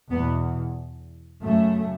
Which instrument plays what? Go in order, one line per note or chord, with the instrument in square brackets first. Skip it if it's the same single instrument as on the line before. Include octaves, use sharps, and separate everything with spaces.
[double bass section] E2 B2 B3
F#2 C#3 A3